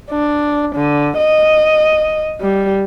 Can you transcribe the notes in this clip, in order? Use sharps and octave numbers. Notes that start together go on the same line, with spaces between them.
D4
D3
D#5
G3